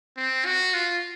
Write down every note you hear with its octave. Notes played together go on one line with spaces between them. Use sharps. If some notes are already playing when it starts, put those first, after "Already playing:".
C4
F#4
F4